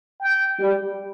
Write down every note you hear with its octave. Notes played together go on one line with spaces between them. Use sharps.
G5
G3